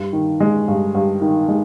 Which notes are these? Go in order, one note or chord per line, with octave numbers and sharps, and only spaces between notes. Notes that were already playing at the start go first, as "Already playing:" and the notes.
Already playing: G2
D#3
G#3
G2
G2
D#3
G#3